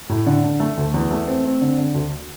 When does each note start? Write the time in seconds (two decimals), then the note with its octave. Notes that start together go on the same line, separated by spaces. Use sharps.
0.09 A2
0.26 D3
0.43 D3
0.60 A3
0.77 D2
0.94 E2
1.11 A3
1.27 C4
1.45 C4
1.61 D3
1.78 D3
1.94 D2